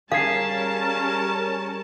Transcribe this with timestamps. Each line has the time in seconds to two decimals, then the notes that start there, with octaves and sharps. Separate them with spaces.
0.12 G3 C#4 G#4 A#4 F5 A5 G#6 C7